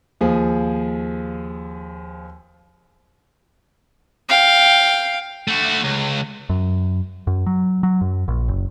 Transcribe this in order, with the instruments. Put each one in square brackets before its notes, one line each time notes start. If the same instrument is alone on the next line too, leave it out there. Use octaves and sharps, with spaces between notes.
[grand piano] D#2 F3 G#4
[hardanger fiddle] F5 G5
[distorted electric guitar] A3 F#4
C#2
[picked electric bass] F#2
F#2
F#3
F#3
F#2
A#1
F#1